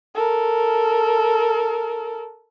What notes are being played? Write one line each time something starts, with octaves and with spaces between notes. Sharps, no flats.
A4 A#4